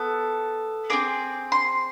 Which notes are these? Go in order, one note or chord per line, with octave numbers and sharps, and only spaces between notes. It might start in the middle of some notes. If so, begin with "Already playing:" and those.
Already playing: B3 A4
C4 D#4 G#4 D6
C6